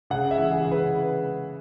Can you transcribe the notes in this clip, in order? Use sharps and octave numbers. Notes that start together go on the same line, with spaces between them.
C#3 F#5
E5
E3
G#4
C#3
B4